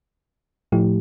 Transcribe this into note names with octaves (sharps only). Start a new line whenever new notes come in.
A2 F3 A3 E4 G4